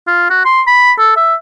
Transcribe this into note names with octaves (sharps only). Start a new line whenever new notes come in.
F4
F#4
C6
B5
A4
E5